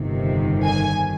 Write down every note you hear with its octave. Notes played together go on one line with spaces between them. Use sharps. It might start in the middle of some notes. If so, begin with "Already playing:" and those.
Already playing: G1 F2 C3 D#3
G#5